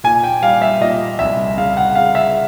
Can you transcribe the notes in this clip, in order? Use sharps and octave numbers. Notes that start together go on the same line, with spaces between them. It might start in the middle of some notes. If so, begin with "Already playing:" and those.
A#2 G#5
G5
G3 F5
E5
A#2 D#5
C2 E5
C#3 F5
F#5
C#3 F5
E5